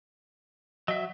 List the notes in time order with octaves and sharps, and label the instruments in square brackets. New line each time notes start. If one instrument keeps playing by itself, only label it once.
[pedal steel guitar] F#3 E5 [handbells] D#5